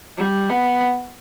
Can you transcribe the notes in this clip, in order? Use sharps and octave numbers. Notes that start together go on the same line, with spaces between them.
G3
B3